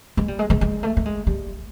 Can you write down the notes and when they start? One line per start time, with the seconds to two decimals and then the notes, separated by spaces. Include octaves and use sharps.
0.17 G#3
0.28 G3
0.39 G#3
0.50 G#3
0.61 G#3
0.83 A3
0.97 A3
1.06 G#3
1.27 G3